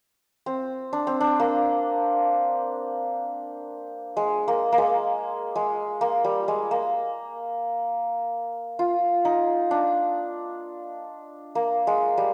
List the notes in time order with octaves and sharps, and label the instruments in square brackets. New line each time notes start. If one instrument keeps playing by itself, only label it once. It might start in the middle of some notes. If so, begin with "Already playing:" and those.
[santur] C4
D4
C4
D4
A#3
G#3
A#3
A#3
G#3
G#3
A#3
G3
G#3
A#3
F4
D#4
D4
A#3
G#3
G3